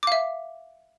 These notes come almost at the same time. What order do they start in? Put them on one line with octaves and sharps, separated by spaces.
D6 F5 E5